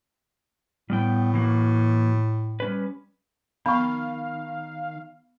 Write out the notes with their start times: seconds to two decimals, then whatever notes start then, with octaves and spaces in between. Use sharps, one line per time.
0.90 A2 G3 B3 G5
1.34 E3 A#3 F#4
2.60 G3 C#4 B4
3.66 D#3 B3 F5 B5 C#6